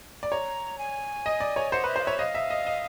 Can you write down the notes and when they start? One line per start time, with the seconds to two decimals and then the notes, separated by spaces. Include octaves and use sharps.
0.23 D5
0.32 C#5 A#5
0.78 G#5
1.26 D#5
1.40 D5
1.56 C#5
1.72 C5 F#5
1.84 B4
1.88 E5
1.96 C5 F5
2.04 C#5 E5
2.19 D#5 F5
2.35 E5
2.50 D#5
2.66 D#5